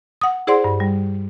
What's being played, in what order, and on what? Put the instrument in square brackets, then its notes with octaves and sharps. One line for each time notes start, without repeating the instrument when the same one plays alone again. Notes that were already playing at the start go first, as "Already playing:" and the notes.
[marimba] F#5 D#6
E4 G#4 C5 D5 F#5 C6
G2
G3